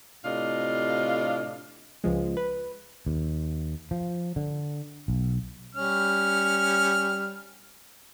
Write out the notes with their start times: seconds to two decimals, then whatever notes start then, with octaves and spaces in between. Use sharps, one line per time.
0.25 A2 C3 D4 F4 D#5 F5
2.04 C#2 F3 G#3
2.37 B4
3.06 D#2
3.91 F3
4.36 D3
5.08 B1
5.75 G3 C#4 F6